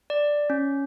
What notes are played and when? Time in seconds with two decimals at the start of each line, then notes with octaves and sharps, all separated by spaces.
0.10 D5
0.50 C#4